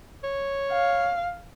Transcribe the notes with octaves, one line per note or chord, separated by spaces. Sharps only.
C#5
F5